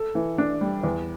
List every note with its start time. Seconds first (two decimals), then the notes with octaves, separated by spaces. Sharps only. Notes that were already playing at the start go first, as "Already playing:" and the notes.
Already playing: A4
0.15 E3
0.38 D4
0.61 G3
0.83 E2